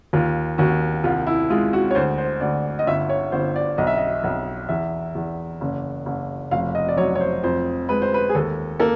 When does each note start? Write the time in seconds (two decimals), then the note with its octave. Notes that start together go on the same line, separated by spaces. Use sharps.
0.13 D#2 F4
0.58 D#2 F#4
1.04 C2 F4
1.27 E4
1.50 G#3 F4
1.73 F#4
1.91 C#5
1.95 D2 C5
2.18 C5
2.41 D2 D5
2.79 D#5
2.87 G1 E5
3.09 C#5
3.32 G1 C5
3.56 D5
3.78 B1 D#5
3.87 E5
3.97 D#5
4.24 B1
4.69 E2 E5
5.15 E2
5.61 F#1
6.06 F#1
6.51 F1 F5
6.75 D#5
6.88 D5
6.97 F#3 C#5
7.15 C#5
7.20 C5
7.43 F2 C5
7.89 G#3 B4
8.02 C5
8.14 B4
8.29 G#4
8.35 D#2 A4
8.80 A#3 A4